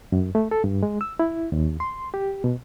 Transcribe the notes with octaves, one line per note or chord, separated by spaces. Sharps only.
F#2
A3
A4
G2
G#3
E6
E4
D#2
C6
G4
B2